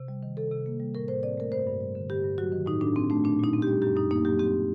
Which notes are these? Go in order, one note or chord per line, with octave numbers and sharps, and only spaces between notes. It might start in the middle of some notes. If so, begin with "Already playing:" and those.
Already playing: C3
G3
D#3
C3 A4
C3
A#3
G3
A2 A#4
A2 C5
C4 D5
A3 A#4
G2 C5
G2
G3
D3
G2 G4
G2
F#3 F#4
D#3
A2 D#4
A2 D4
C4
A3 D4
A#2 D4
A#2 D#4
C4
G4
G3
F#2 G4
F#2 D#4
A#3 D#4
F#3 G4
C4 G4